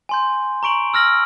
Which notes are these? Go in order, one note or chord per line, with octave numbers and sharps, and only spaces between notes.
G#5 C6 G6
A#5 C#6 D7 F#7
E6 F6 A#6 F#7